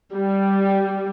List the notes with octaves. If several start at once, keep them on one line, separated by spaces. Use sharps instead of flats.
G3